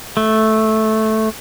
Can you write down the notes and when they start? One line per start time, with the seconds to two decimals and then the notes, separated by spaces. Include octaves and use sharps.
0.17 A3